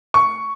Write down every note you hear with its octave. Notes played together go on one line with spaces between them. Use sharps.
C#6